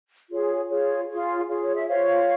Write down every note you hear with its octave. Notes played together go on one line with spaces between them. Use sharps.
F4 G#4 C#5
F4 G#4 C#5
F4 G#4 C#5
F4 G#4 C#5
C#5
E5
F4 C5 C#5 F5